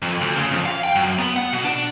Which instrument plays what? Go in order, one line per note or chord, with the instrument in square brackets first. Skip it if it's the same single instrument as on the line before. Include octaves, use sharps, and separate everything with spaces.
[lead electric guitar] F2
D2
C#3
F2
F5
G5
F#2
B3
F#5
B2
D4